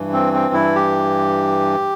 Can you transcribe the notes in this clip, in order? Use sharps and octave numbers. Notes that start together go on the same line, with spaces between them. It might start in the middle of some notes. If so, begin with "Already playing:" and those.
Already playing: G2 E3
C4
C4
E4
G4